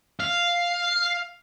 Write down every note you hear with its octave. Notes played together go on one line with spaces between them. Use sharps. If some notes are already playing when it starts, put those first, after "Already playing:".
F5